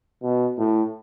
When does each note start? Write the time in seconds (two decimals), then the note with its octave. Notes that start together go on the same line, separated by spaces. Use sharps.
0.23 B2
0.58 A2